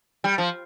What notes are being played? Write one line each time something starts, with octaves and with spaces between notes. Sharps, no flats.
G3
F3